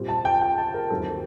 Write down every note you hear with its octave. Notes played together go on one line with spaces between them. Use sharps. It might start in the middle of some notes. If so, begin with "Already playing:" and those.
Already playing: A#2 G3 C4
A5
G5
G5
A5
A#4
D#2 D#3 F#3 C4 A4